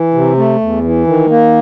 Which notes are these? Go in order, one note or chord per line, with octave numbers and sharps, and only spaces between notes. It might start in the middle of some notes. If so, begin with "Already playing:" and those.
Already playing: E3
C3
A3
E2
E3
D#3
A#3